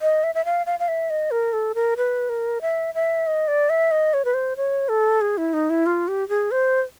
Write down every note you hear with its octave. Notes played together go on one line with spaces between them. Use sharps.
D#5
E5
E5
F5
F5
F5
E5
D#5
A#4
A4
A#4
B4
A#4
E5
E5
D#5
D5
E5
D#5
C#5
B4
C5
C#5
A4
G#4
E4
D#4
E4
F4
G4
G#4
C5